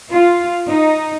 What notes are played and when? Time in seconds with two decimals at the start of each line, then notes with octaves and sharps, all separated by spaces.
0.12 F4
0.69 D#4